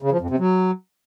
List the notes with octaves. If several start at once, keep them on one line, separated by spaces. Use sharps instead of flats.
C#3
F3
F2
C3
F#3